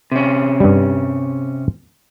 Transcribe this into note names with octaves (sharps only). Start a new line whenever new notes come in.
C3 C#4
G2 G3